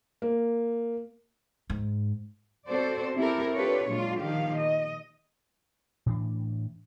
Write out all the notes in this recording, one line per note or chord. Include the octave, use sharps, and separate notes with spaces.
A#3
G#2
C4 F#4 A4 C5 D5
C4 E4 G4 A4 A#4
D4 F4 G4 A4 B4 C#5
A#2 F#3 G#3 D4 F4
A#2 D#3 F3 G4 F5
D#5
A2 E3 D4